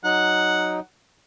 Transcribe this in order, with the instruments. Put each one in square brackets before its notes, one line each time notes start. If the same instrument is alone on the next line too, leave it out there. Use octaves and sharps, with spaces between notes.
[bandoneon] F#3 D#4 [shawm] F#5